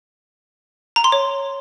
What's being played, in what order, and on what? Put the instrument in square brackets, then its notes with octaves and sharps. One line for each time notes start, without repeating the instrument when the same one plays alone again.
[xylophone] A#5
C6
C#5